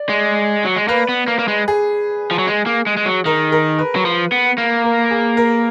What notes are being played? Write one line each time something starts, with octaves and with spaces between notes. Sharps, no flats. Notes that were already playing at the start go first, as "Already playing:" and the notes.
Already playing: D5
G#3
F#3
G#3
A#3 B4
B3
A#3
A#3
G#3
G#4
F3
F#3
G#3
A#3
G#3
G#3
F#3
D#3 A#4
A#4
B4
F#3
F3
B3
A#3
A#4
G#4
A#4